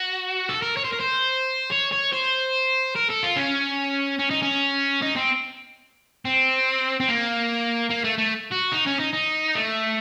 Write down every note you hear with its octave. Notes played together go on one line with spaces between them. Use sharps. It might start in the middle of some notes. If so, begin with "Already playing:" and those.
Already playing: F#4
A4
A#4
C#5
C5
A#4
C5
C#5
C#5
C5
A#4
A4
F4
C#4
C#4
D#4
C#4
D#4
C4
C4
C4
A#3
A#3
A3
A3
F#4
D#4
C#4
D#4
D#4
A3